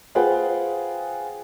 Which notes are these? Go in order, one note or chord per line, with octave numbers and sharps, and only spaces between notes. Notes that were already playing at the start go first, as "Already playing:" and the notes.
F4 G#4 B4 C5 F#5 G5